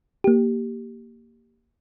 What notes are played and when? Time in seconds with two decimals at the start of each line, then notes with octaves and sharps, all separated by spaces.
0.24 A#3 G4